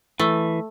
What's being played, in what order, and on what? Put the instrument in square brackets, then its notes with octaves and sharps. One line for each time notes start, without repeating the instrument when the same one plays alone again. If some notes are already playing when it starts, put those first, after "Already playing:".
[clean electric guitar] E3 [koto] A3